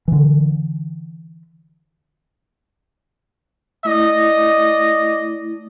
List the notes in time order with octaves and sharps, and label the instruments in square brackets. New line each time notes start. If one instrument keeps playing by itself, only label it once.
[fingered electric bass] D3 E3
[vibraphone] A3 E4 [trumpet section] D5 D#5